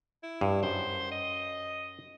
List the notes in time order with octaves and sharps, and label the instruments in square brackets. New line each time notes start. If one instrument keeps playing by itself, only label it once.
[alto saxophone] E4
[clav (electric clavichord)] G2
[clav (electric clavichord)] F#2 [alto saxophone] C5
[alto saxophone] D#5